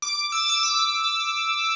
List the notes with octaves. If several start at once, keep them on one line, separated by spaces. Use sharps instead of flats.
D6
E6
E6
D6